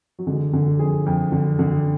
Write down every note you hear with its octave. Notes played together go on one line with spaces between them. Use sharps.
F#3
D3 G#3
D3
F2 G#4
F2
D3
D3